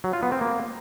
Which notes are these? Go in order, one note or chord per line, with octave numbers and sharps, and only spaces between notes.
F#3
F4
B3
C4
A#3